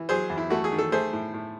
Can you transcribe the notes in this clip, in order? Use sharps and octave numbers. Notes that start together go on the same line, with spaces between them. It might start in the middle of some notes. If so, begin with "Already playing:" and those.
Already playing: E3
F#3 G#4 C5
E2
E4
A3 F#4
G#4
D#3
A4
A3 G#4 C5
A2
A2